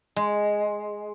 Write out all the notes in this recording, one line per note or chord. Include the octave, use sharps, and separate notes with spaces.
G#3